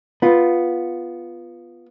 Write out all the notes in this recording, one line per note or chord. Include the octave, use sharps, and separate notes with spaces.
B3 F4